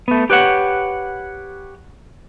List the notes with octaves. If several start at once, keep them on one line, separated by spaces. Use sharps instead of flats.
A3 B3
G4 B4 C#5 F#5